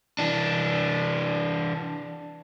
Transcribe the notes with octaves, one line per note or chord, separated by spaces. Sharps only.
E3 D4